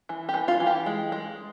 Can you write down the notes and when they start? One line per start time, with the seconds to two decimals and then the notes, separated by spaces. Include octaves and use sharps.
0.09 E3
0.29 G4
0.34 E3
0.48 F4
0.60 E3
0.67 G4
0.86 G#3
1.12 G#3